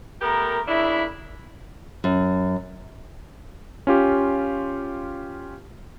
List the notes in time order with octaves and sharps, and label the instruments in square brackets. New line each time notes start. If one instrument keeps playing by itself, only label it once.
[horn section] A3 B3 G4 A#4
A#2 C#3 D4 E4
[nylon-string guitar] F#2
[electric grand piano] C#4 F4 G4